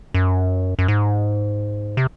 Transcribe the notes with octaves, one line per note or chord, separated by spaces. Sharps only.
F#2
F#2
G#2
C3